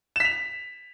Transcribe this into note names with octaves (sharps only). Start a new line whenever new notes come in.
B6 E7 F7